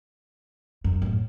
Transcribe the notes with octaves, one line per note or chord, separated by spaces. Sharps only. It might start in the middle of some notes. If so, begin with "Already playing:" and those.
F#2
A2